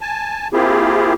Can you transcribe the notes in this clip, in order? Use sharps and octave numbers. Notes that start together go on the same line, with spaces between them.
G#5 A5
A#3 C4 E4 F4 G4 G#4